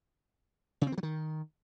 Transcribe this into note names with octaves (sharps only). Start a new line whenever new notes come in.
C#3
C4
D#3
F#3
D#3